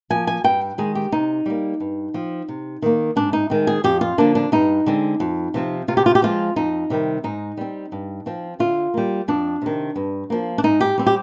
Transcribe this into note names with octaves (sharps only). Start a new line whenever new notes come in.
F3 A#3 G#5
G#5
G2 G5
D#3 G#3 G#4
G4
C3 D#4
G3 A#3
G2
F3 C4
C3
D#3 A#3
G#2 D4
D#4
D#3 G#3 C4
G#4
F2 G4
F4
D3 F3 A#3 D4
D4
G2 D#4
D3 G#3 C4
F2
C3 F3 C4
C3 F4
G4
F4
G4
F3 G#3 C4 F4
F2 D#4
C3 D#3 G3
G#2 D#4
G3 C4
G2
F3 C4
D3 F4
G3 A#3
F2 D4
C3 D#3
G2
F3 A#3
D4
G#2 D#4
G4
G3 C4
G4